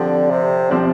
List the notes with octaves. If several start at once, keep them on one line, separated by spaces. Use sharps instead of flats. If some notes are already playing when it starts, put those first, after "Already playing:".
Already playing: D3 F3 C4 G4 D5
C3
D3 F3 C4 G4 D5